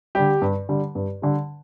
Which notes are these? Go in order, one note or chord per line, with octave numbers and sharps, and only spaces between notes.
D3 G3 G4
G2
D3 G3
G2
D3 G3